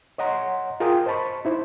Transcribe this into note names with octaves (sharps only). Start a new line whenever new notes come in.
C#5 D#5 F#5 A#5 C6
F4 G#4 A#4 F5 G5 D#6
C5 D#5 A5 B5 C#6
D#4 E4 C5